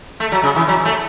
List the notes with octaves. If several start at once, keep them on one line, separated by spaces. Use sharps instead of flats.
A3
F#3
C#3
E3
F#3
A3